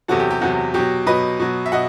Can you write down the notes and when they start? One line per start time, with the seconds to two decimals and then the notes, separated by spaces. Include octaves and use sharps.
0.08 E2 C3 F#3 F#4 A4
0.20 G4
0.31 G4
0.41 E2 C3 F#3 F#4
0.74 B2 F#3 G4
1.07 B2 F#3 B4 D#5
1.40 B2 F#3
1.66 E5
1.72 B2 D#5 F#5